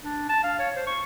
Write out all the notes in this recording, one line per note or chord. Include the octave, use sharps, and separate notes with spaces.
D4
A5
F5
C#5
C5
C#6